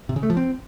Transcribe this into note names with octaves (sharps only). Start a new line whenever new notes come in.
C3
C#3
A3
F3
C4